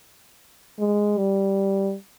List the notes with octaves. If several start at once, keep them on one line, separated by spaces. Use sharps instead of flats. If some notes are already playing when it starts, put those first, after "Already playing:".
G#3
G3